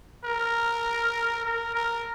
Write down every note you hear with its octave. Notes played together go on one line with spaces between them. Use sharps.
A#4
A#4
A#4